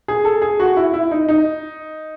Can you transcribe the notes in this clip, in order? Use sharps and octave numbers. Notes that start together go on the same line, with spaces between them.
G#4
A4
G#4
F#4
E4
E4
D#4
D#4